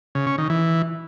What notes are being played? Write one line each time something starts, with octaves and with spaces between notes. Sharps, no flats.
C#3
C#4
D#3
E3